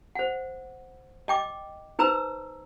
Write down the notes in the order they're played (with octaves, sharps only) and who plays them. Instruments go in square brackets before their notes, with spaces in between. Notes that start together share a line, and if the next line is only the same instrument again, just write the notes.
[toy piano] C5 F#5
D#5 G5 D6
D#4 B4 C5 A#5 E6